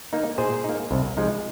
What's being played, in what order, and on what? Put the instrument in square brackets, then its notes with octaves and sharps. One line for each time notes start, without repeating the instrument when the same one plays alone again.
[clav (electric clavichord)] A#3 D#4
A#2 G#4 C5
A#3 D#4
C2
C3 F3 G#3 D#4